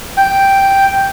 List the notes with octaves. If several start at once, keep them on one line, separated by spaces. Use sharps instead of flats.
G5